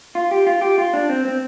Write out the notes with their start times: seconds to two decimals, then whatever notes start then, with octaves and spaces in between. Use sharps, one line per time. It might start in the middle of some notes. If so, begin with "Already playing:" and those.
0.15 F4
0.31 G4
0.47 F4
0.61 G4
0.78 F4
0.94 D4
1.09 C4
1.25 C4